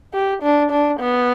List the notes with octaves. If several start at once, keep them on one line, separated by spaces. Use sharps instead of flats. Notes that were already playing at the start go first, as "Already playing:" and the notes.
G4
D4
D4
B3